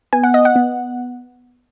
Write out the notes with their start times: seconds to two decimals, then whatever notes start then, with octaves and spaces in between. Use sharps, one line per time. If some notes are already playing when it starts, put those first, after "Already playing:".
0.13 B3 G#5
0.23 F#5
0.34 D#5
0.45 F#5
0.56 B3